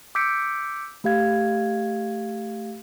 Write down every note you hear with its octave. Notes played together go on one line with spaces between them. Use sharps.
D6 E6 G6 B6 C#7 D7
A3 G4 F5 G#6